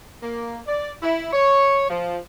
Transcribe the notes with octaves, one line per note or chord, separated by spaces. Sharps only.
A#3
D5
E4
C#5
F3